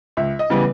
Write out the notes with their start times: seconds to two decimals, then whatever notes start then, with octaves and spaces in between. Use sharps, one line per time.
0.17 C#2 E5
0.39 D#5
0.50 C#3 E3 G3 B3